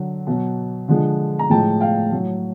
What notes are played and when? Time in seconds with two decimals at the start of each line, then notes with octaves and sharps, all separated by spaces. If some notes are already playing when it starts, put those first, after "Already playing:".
Already playing: D3 F#3
0.27 B2 F#3
0.88 D3 F3 G#3
1.39 A#5
1.50 A2 F3 G#3 G5 A5
1.81 F5 G5
2.12 A2 F#3